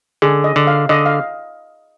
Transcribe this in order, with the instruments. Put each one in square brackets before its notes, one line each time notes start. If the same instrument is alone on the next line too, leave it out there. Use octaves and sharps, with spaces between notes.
[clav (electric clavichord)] D3 [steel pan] G#4
[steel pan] D#5
[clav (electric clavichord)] D3
[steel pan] F5
[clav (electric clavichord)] D3 [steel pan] D#5
[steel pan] F5